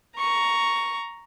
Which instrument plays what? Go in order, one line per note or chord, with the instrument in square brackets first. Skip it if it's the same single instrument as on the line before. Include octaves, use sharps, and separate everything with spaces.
[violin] A#5 C#6